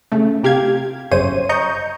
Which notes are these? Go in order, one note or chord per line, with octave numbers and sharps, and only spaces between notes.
C#3 A3
C3 G4 F5 G#6
G1 F#2 C#3 C5 C#5 D#7
D#5 A#5 C#6 G6